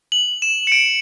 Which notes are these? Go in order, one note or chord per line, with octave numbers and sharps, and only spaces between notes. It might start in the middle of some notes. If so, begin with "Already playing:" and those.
F#7
E7
C#7
D7